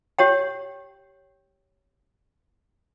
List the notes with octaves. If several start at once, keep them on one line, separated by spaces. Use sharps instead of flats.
G4 C#5 G5